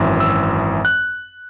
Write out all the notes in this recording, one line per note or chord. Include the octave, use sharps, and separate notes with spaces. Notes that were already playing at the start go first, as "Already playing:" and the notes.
Already playing: G#1 F#2 E3
E6
F#6